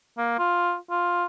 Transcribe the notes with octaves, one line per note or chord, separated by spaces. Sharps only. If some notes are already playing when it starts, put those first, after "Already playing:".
A#3
F4
F4